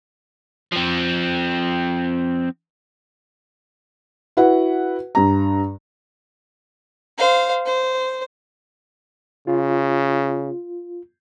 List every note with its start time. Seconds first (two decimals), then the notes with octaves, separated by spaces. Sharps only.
0.72 F3 C4
4.37 E4 F#4 B4 F#5
5.15 G2 A#5
7.18 C5 F5
7.66 C5
9.47 C#3 F4